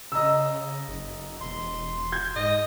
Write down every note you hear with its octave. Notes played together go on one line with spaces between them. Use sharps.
C#3 D#5 A#5 E6
F#1
E1 C6
G6 G#6
G#2 D#5